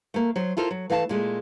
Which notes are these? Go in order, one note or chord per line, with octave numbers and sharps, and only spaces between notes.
A3 A#3
F#3 C5
E4 F4 A4 A#4 C5
F#3
E3 A3 F5 G#5 A5
A#2 G#3 A3